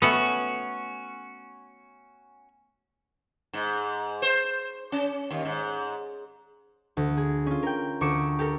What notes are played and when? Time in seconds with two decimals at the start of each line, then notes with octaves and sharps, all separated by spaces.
0.02 A3 B3 C#4 F#4
3.53 G#2
4.22 C5
4.92 C#4
5.31 D#2
5.45 G#2
6.97 D2
7.17 G#4
7.46 C#4 F4
7.63 A#4 G5
8.01 D2 C#6 D6 C#7 E7
8.39 G4 A4 A#4